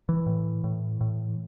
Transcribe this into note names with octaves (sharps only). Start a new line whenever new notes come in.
E3
A2
A2
A2